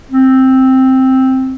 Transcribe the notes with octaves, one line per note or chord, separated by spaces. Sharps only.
C4